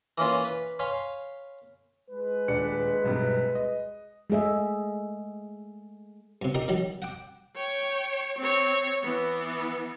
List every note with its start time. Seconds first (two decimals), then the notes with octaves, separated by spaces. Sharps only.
0.18 E3 A#3 C#4 F4
0.44 B4
0.79 C#5 F5 G#5 B5 C6
2.10 G#3 B4
2.48 D#1 D4 C#7
3.04 B1 G2 C3
3.55 D#5
4.30 G#3 A3 G#4 D#5 E5
6.42 G2 C3
6.54 D#4 G4 A#4 D5 D#5
6.68 D#3 F#3 G3
7.02 F#5 G5 D6
7.56 C#5 G5
8.38 C4 C#5
9.03 E3 B3